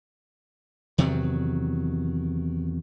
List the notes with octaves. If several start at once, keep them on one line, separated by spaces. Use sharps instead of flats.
E2 C3 D#3 F#3